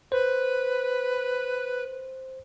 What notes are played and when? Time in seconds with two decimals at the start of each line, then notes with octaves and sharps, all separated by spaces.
0.12 B4 C5